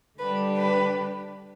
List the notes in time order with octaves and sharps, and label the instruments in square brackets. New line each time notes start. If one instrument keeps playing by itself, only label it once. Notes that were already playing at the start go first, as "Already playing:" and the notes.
[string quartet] D3 G3 D4 G4 [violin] B4
[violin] B4